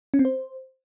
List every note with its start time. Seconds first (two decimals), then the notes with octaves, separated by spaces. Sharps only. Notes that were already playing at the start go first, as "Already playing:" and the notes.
0.14 C#4
0.19 C4
0.25 C5